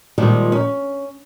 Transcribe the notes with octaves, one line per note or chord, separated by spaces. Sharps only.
A#2 D#3 F3 G3 G#3
C#4